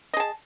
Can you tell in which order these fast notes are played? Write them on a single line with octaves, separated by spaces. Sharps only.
D#5 G#4 A5